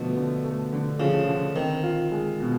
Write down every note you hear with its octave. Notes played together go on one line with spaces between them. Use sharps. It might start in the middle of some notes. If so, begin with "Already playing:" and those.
Already playing: B2 D3 F3 A3
D3
A3
D3
C#3 F3
D3
D#3 C4
F4
G#3
B2